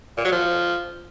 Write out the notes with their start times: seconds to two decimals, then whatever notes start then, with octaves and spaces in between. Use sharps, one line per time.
0.17 A#2
0.25 F#3
0.32 F3